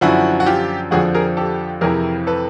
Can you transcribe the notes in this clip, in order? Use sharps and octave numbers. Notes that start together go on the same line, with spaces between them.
F#2 D3 F3 E4 F#4
F#4
F4 G4
F2 D3 F3 F#4 G#4
G#4 A#4
G4 A4
F2 C3 E3 G#4 A#4
A4 B4